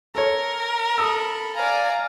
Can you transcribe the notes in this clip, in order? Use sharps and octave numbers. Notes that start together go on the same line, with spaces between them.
A4 A#4 C#5
A4 B5 D#6 E6
D5 F5 G#5 A#5